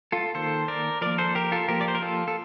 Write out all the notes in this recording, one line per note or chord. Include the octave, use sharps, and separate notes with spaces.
F4 A4
D#3 A#3 A4 C5
A#4 D5
F3 A#3 A#4 D5
A4 C5
G4 A#4
F4 A4
F3 A#3 G4 A#4
D5
C5
A#4
F4 A4
A4